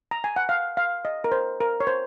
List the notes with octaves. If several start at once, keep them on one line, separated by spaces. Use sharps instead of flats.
A#5
G#5
F#5
F5
F5
D#5
A#4
C5
A#4
C#5
C5